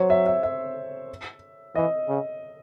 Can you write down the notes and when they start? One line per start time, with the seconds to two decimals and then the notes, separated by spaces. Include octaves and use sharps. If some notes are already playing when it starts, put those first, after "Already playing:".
Already playing: F#3 C5 C#5
0.10 E5
0.26 E5
0.43 E5
1.75 E3 D#5
2.09 C#3